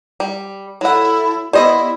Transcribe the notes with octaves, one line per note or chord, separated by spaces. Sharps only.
G3
F#3 E4 A4 F#5
B3 E4 G4 C5 D5 D#5